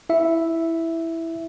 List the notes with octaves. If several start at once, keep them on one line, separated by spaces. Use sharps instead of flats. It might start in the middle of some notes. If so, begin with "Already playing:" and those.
E4 E5